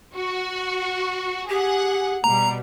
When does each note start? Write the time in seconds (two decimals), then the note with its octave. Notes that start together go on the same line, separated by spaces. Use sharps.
0.16 F#4
1.49 G4 G#4 F#5
2.24 B2 G3 A#5